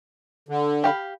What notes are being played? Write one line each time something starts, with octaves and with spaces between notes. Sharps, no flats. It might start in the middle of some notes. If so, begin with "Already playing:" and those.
D3
G4 F5 B5